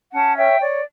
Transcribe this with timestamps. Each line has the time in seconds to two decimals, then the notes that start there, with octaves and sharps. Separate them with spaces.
0.13 C#4 F#5 A5
0.37 C#5 E5 G5
0.61 C#5 D5